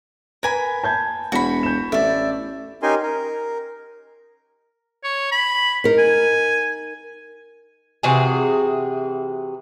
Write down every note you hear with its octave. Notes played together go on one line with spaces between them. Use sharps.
A#4 B4 G#5 B5
A5 G6 G#6
E1 F#4 B5
G6 E7
A1 A3 D5 E5
C#4 D#4 G4 A#4 G#5 C6
A#4
C#5
B5
D#4 A#4
G#5
C3 E3 F#4 G#4